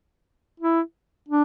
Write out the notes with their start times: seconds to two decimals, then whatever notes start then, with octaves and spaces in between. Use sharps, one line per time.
0.60 E4
1.29 D4